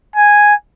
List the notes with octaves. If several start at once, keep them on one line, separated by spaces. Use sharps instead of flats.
G#5